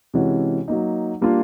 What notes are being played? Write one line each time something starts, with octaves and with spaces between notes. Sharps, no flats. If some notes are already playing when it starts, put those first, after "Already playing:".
C3 E3 G#3 C#4 F#4
F#3 A#3 D#4
G3 A#3 D4 F4